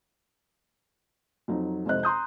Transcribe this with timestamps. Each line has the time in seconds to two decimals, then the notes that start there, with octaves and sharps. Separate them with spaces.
1.48 F2 F#3 D#4
1.86 G#1 F2 C3 C5 D#5 F#6
2.03 A#5 C6 D#6 G6